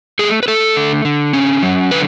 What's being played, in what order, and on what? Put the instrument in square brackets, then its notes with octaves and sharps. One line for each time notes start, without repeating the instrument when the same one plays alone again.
[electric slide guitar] A3 G#4
B4
A3 A4
D3
D3
C#4
F#3
D3 B4